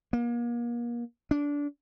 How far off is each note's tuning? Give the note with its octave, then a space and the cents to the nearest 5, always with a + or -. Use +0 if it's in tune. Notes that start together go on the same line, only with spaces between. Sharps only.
A#3 +35
D4 -20